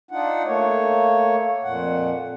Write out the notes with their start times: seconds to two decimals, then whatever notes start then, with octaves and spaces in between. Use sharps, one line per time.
0.11 D4 D#4 F4 F#5
0.46 A3 A#3 C#5
1.63 F2 A#2 F#5